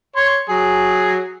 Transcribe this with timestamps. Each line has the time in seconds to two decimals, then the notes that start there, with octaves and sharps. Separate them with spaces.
0.16 C#5 C6
0.49 F#3 G#4